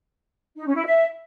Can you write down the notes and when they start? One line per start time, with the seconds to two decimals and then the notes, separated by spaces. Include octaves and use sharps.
0.56 D#4
0.65 C#4
0.75 E4
0.85 E5